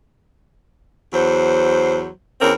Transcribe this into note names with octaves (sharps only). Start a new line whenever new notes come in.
E2 F#3 C5
E2 C4 C#4 A#4